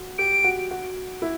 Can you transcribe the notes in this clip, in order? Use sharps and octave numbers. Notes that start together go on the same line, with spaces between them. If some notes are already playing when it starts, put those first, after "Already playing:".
Already playing: F#4
G4 D7
F#4
F#4
E4